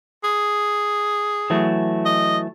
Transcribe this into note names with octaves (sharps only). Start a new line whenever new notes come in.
G#4
E3 F#3 A3
D#5